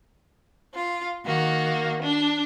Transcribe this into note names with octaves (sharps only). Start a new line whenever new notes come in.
F4
D#3 A#3 F#4
D4